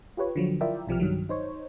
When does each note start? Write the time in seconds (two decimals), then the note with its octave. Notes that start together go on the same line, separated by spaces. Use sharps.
0.17 F4 G4 B4 C#5
0.36 D3 F3 F#3
0.61 E4 F4 A#4 D5 E5 G5
0.87 B1 C3 F3 G4 F6
1.00 G2 D#3 F#3
1.29 D#4 C5 C#5